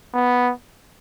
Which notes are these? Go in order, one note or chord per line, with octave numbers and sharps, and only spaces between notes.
B3